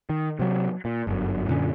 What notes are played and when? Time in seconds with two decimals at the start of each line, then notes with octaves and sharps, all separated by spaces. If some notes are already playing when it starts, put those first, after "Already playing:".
0.10 D#3
0.39 C3 F#3
0.85 A#2
1.07 G1 F#2
1.48 F#2 A#2 D3 C#4